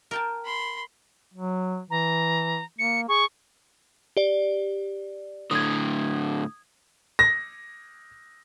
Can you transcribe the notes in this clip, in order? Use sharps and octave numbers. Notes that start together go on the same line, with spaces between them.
A#4 G5 A5
B5 C6
F#3
E3 A#5
A#3 C#7
G#4 C#6
G4 D5
A2 D3 D#6 G#6
A#6